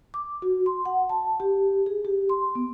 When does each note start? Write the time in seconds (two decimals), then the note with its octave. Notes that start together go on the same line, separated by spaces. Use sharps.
0.14 D6
0.42 F#4
0.66 C6
0.85 F#5
1.09 A5
1.40 G4
1.86 G#4
2.05 G4
2.29 C6
2.55 B3